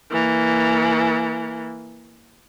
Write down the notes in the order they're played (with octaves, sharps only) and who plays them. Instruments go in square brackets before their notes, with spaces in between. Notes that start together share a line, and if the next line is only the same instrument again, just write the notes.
[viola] E3 A#3